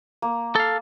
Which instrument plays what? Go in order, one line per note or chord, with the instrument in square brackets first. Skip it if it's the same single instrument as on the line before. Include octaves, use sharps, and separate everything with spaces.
[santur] A#3
[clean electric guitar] A4 F5